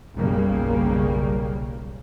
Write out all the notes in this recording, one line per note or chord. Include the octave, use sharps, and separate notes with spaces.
F#1 B1 C#3 G3 A#3